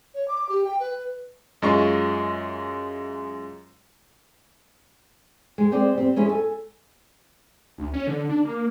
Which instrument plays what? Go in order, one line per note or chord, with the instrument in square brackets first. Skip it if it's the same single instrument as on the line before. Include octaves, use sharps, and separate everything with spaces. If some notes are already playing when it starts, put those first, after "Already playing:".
[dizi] C#5
D6
G4
G5
B4
[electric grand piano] F#2 G#3 F4 D#5 C#6
[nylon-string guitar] G#3
G#3 C4 C5 D5
G3 C4
G#3 C#4 E4 G#4
A4 G#5
[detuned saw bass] D2
C#4
D3
D4
A#3